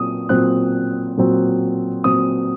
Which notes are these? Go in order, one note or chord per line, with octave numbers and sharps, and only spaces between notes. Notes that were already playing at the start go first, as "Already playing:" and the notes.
Already playing: A#2 F#3 C4 D#6
A#2 F#3 C4 F#6
A#2 F#3 C4
A#2 F#3 C4 D#6